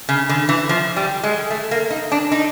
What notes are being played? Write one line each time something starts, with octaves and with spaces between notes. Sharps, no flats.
C#3
D3
E3
F3
G3
G#3
A3
A#3
D#4
D4
D#4